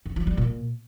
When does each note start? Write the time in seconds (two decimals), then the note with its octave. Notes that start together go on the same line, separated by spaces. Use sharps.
0.06 F#2
0.16 F3
0.27 G3
0.37 A#2